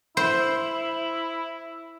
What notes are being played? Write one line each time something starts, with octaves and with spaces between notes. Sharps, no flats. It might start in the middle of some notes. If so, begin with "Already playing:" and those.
E4 C5